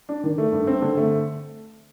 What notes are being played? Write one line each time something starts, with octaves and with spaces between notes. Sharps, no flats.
D4
D#3
A3
G2
C4
D3
A3